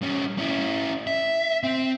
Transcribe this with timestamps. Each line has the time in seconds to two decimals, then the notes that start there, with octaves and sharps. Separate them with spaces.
0.02 G3 C#4
0.38 C#4 E4
1.07 E5
1.63 C4